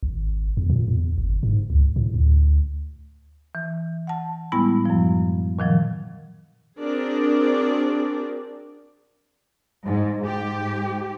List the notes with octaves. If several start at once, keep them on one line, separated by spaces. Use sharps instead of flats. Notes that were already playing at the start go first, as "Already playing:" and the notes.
G#1
E2
A#2
E2
G1
G#2
C#2
A2
D2
E3
F#5 A5
A2 G3 G#3 B3 E4 B5
F#2 F3
A#2 D#3 F3 F#3
C4 D4 F#4 G#4 A#4 D5
G#2
G#2 G4